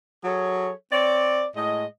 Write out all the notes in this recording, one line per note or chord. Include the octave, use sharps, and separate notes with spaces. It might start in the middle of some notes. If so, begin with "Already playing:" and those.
F#3 G#4 A4 C#5
C4 C#5 D5
A2 G#3 D#5